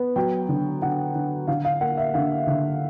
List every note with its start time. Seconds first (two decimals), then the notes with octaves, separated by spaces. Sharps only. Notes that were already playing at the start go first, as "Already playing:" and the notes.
Already playing: B3
0.16 F#3 G5
0.49 D3
0.82 D3 F#5
1.15 D3
1.47 D3 F5
1.65 F5
1.81 A#3 F#5
1.97 E5
2.14 D3 F5
2.47 D3